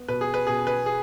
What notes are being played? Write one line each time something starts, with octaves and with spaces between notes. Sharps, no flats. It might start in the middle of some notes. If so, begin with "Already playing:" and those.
Already playing: B3
B2 B4
G#4
B4
B2 G#4
B4
G#4